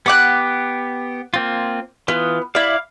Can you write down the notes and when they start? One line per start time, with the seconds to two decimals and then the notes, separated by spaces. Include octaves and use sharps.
0.06 B3 G4 F#5 D6 F#6
1.34 A#3 C4 F4
2.08 E3 B3 F4
2.55 E4 D5 F5